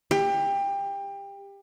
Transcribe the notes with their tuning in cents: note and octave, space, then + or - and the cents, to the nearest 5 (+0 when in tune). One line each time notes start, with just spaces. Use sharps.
G4 +25